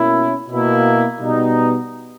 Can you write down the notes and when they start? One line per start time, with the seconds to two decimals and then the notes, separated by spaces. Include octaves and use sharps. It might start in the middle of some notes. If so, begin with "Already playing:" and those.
Already playing: B2 A#3 C#4 E4
0.48 B2 A#3 E4
1.19 B2 G3 B3 D#4